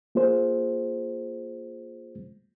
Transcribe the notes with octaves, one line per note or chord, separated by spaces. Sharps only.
A#3 F4 G#4 C5